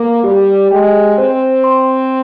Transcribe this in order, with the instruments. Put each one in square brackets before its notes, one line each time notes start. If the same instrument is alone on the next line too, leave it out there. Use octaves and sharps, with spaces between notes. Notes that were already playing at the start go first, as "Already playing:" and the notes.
Already playing: [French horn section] A#3 [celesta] D6
[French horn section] G3 [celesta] G4
[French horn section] G#3 [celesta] G5
[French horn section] C4 [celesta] C5
[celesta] C6